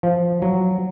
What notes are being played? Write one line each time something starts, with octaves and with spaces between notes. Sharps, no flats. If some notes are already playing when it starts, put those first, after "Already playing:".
F3
F#3